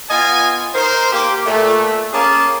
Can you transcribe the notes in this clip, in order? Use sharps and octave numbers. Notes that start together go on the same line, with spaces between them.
B3 F4 D#5 F5 G#5
D#4 A#4 C5
A#3 G4
A#2 A3
A#3 C#4 G#4 F5 A5